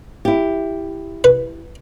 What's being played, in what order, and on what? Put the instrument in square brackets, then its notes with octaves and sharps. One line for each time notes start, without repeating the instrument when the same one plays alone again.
[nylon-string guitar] E4 G4
[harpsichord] B4